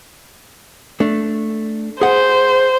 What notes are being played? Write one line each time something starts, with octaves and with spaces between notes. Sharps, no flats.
A3 D4
G#4 C5 F#5